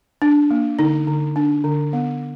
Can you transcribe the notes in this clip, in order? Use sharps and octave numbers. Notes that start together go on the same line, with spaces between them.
D4
A#3
D3 D#4
D3
D4
D3
B3